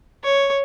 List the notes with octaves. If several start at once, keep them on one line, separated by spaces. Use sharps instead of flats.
C#5